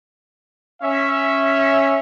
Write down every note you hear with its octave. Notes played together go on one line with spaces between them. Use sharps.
C#4 E5